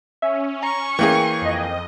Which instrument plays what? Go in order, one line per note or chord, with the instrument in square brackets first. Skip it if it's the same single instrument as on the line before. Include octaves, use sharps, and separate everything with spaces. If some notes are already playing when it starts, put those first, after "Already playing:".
[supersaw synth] C#4 [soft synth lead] E5
[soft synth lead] A#5 [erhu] C#6
[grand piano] E3 A#3 G#4 [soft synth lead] G5
[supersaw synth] F2 D#5